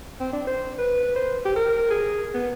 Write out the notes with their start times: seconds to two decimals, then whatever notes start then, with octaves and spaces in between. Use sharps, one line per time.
0.21 C4
0.33 D4
0.47 C5
0.79 B4
1.16 C5
1.45 G4
1.56 A#4
1.90 G#4
2.34 B3